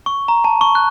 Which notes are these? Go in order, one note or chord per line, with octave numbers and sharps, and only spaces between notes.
C#6
A#5
A5
C#6
F#6